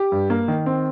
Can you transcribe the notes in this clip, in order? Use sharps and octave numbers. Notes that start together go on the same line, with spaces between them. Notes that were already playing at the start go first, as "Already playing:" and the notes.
Already playing: G4
G2
A#3
D#3
C4